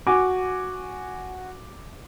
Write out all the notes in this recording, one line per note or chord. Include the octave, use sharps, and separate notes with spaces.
F#4 G#5 D6